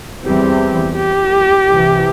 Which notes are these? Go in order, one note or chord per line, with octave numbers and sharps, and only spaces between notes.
E2 E3 G3 C4 G4
G4
C2 C3 E3